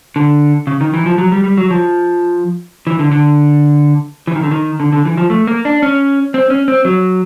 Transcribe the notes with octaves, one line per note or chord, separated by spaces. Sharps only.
D3
C#3
D#3
E3
F3
F#3
G3
G3
F#3
F3
E3
D3
D3
E3
D#3
D3
D#3
D3
D3
E3
F3
A3
A#3
D4
C#4
C4
C#4
C4
F#3